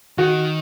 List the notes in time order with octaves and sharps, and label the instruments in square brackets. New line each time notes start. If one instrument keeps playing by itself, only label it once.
[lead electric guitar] D#3 [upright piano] F#4